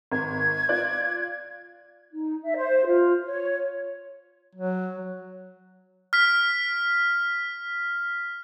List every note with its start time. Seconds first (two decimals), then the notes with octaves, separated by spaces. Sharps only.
0.12 G#1 G#6
0.69 F4 D5 F#6
2.12 D#4
2.43 E5
2.56 C5
2.86 F4
3.25 C#5
4.55 F#3
6.13 F6 B6